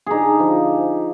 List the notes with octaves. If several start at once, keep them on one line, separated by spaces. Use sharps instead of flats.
D3 D#4 G4 G#4
F3